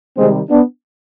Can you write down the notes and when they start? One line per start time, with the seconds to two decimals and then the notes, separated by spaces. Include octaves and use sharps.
0.16 C3 D#3 G3 G#3 C4
0.50 B3 D4